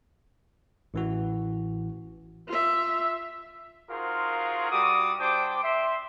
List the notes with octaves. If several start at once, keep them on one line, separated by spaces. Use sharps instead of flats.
A1 E3 F#4
F4 E5
D#4 F4 F#4 G#4 A#4 C5
G3 F#4 D6 D#6
G3 D4 C5 G5 D6
E5 C6